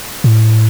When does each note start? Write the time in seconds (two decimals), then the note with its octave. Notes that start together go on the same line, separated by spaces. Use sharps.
0.24 A2